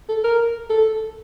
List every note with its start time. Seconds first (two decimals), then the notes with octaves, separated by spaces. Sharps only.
0.09 A4
0.24 A#4
0.70 A4